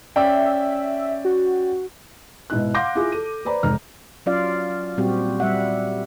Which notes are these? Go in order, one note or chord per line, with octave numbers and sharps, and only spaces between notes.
C#4 D5 E5 G5
F#4
G#2 B2 E4 F#6
F5 F#5 C6 D6 G6 A#6
E4 F4 G#4
A4 D#7
B4 C5 D5 A#5 B5
F1 G#2 A#5 F6
F#3 C#4 F4 D5 F5
A#2 G3 C4 F#4 G4
G3 E5 F#5